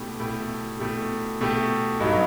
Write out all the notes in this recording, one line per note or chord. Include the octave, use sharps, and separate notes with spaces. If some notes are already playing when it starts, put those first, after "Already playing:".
Already playing: B2 A3 E4 G4
B2 A3 E4 G4
B2 A3 E4 G4
B2 A3 E4 G4
G2 F#3 B3 D#4 F#4